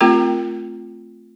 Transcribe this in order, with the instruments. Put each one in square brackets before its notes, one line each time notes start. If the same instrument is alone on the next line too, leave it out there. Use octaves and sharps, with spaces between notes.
[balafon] A3 C4 F4 G4 A#4 G5